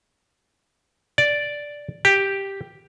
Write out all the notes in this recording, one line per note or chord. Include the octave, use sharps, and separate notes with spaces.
D5
G4